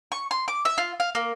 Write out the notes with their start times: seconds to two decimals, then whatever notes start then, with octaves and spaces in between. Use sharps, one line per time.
0.12 C#6
0.31 C6
0.48 D6
0.65 E5
0.78 F4
1.00 F5
1.15 A#3